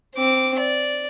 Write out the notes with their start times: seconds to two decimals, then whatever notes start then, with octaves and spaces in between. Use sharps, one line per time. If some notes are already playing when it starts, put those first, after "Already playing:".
0.16 C4 D6
0.59 D5